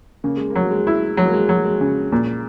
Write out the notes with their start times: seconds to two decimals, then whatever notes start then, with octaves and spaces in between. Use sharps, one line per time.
0.24 C#3 A#3
0.37 G#3
0.50 A#3
0.55 F#3
0.71 G#3
0.87 E4
1.17 F#3 G#3
1.26 A#3
1.33 G#3
1.49 F#3
1.64 G#3
1.81 C#3
2.12 A#2